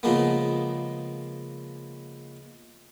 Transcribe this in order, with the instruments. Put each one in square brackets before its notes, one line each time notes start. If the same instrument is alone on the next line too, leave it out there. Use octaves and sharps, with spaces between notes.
[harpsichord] C#3 F3 G#3 A#3 B3